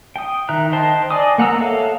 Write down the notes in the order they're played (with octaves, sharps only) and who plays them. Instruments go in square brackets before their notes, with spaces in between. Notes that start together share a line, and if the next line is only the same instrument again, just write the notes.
[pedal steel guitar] G5 D#6
D#3 E5 A#5 F#6
C5 D#5 G5 A5 C6
D5 D#5 G#5 D6 D#6
A#3 F#5 A#5 E6
A4 C#5 E5 F5